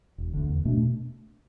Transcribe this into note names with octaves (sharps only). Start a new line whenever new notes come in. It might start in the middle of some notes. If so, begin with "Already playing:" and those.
E1
D2 D3
E2
B2 A3 D4